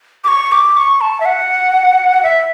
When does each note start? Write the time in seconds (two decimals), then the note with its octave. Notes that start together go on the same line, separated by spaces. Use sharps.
0.24 D6
0.28 C#6
0.52 D6
0.77 C#6
1.01 A5
1.20 E5
1.25 F#5
2.23 E5